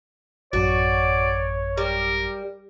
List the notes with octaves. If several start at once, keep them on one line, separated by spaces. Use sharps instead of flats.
A1 F#2 F#4 C#5 D5
G3 A#4